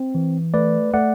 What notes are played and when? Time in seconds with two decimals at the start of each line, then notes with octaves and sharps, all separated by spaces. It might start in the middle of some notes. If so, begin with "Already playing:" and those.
Already playing: C4
0.15 E3
0.54 A3 B4 D5
0.93 A3 D5 F#5